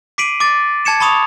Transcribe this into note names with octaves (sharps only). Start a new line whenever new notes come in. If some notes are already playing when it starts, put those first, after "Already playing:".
D6 B6 C7 D7 D#7 F#7
D6 A6
A5 G#6 C#7 E7
A5 B5 C#6 D#6 F7